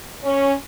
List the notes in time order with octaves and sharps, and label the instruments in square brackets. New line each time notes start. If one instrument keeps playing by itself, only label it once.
[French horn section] C#4